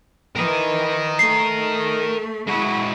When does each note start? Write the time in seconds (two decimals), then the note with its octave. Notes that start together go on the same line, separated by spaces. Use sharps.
0.36 E3 A#4 D#5
1.19 A3 C7
2.47 G#3 E4 F#4